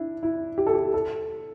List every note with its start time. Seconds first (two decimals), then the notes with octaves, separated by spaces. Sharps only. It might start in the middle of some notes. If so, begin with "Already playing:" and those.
Already playing: D4 E4
0.23 E4
0.58 G4
0.67 A4
0.74 G4
0.94 A4